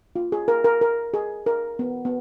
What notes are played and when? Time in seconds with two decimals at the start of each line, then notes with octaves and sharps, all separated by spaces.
0.16 F4
0.32 G#4
0.48 A#4
0.64 A#4
0.81 A#4
1.14 G#4
1.46 A#4
1.79 B3
2.05 B3